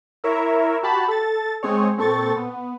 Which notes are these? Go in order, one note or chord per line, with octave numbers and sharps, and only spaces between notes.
E4 A#4 C#5 E5
F#4 G4 A5 B5
A4 A6
G#3 C4 G#4 C#5
A#2 C4 A4 C#6 A6
B3